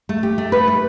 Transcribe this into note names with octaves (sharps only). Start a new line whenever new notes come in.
A3
G4
A3
B4
A3